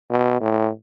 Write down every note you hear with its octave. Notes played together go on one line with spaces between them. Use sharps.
B2
A2